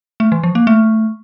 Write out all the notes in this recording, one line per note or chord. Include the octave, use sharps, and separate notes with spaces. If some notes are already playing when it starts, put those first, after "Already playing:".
A3
E3
F3
A#3
A3